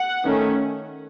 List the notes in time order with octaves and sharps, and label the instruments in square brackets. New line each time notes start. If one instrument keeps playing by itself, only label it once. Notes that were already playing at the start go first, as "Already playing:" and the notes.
Already playing: [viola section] F#5
D#3 A3 C#4